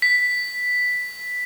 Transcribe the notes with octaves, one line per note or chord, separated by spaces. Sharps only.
B6